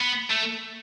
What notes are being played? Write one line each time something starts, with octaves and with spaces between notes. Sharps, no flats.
B3
A3